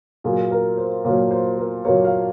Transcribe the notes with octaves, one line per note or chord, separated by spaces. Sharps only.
A#2 F#3 A#3 G#4
A#4
C5
A#2 F#3 A#3 C#5
C5
A#4
A#2 F#3 A#3 C#5
F5